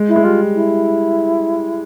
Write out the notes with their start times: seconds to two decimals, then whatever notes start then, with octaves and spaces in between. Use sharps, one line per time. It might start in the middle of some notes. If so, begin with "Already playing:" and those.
Already playing: G#3
0.08 E4
0.16 G#3
0.23 G3 F4
0.55 E4